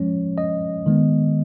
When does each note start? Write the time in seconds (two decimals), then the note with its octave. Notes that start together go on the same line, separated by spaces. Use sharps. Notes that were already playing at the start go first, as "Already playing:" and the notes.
Already playing: F3 G#3 C#4 C#5
0.38 D#5
0.86 D#3 G#3 B3